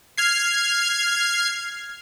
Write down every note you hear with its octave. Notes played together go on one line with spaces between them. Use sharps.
F6 G#6 C7